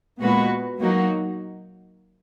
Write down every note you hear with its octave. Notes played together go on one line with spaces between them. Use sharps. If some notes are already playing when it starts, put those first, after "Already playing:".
A#2 G#3 B3 F#4 B4
F#3 A#3 D#4 F#4